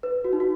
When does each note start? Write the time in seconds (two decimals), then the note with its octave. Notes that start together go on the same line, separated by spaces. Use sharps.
0.03 B4
0.24 F#4
0.33 D#4
0.40 F#4